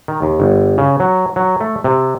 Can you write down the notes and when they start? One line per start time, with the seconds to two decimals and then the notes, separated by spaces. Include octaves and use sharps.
0.08 D#3
0.22 D#2
0.40 G1
0.78 C#3
1.00 F#3
1.36 F#3
1.61 A3
1.84 C3